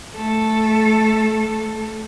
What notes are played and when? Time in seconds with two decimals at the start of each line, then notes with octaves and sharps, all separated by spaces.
0.16 A3 A4